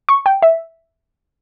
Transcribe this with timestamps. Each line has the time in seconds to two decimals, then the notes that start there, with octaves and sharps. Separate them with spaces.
0.09 C#6
0.26 G5
0.42 E5